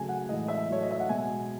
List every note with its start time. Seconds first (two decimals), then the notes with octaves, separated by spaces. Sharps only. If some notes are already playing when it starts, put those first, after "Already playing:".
Already playing: C#3 F#3 A3 G#5
0.09 F#5
0.29 A2 E3 G#3 D#5
0.48 E5
0.68 A2 F#3 A3 C#5
0.82 D#5
0.91 E5
1.00 F#5
1.09 B2 G#3 G#5